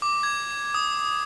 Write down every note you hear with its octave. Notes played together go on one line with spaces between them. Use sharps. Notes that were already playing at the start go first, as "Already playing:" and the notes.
D6
G#6
D#6